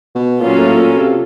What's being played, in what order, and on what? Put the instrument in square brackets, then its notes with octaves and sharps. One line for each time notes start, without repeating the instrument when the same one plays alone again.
[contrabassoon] B2
[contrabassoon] A#2 [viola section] F#3 A#3 C#4 F4 A4
[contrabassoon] A2
A#2
C3